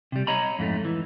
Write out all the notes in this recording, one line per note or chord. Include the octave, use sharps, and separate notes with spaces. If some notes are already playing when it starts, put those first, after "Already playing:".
C3 G3
C#5 D#5 A#5 B5
F2 G#2 G#3 A3
E3